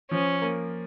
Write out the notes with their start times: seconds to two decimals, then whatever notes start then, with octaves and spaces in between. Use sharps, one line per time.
0.11 F3 C#4
0.41 A#3